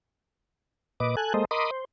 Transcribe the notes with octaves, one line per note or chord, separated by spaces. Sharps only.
A#2 B4 D#5 D6
A4 G#5 F#6
G#3 A#3 A4 C5 D#5
A#4 D#5 B5 C6 D6 D#6
C5